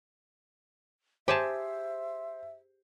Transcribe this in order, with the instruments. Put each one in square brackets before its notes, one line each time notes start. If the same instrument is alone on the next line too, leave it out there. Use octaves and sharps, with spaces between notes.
[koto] G4 G#4 A5 [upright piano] C5 [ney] E5